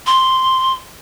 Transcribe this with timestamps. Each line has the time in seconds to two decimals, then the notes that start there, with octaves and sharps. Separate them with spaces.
0.07 C6